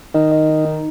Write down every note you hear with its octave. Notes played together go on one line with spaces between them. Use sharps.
D#3 D#5
D#5
D#4
D#4